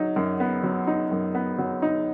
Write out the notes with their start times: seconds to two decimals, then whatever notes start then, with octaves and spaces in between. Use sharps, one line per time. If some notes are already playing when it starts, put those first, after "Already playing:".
Already playing: F#3 D#4
0.16 F#2
0.40 B3
0.64 F#3
0.87 D#4
1.11 F#2
1.35 B3
1.58 F#3
1.82 D#4